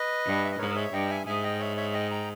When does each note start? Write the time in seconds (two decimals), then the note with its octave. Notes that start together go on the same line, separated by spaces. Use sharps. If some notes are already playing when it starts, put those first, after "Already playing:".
Already playing: B4 D#5
0.25 G2
0.45 E5
0.52 D#5
0.59 G#2 A#4 C#5
0.75 C#5 E5
0.92 G2 D#5 G5
1.10 E5 G#5
1.26 G#2 E5 G#5
1.43 D#5 G5
1.60 C#5 E5
1.77 C#5 E5
1.94 D#5 G5
2.11 G5 A#5